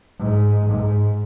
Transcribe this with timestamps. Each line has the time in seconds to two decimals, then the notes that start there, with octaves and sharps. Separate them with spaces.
0.19 G#2
0.70 G#2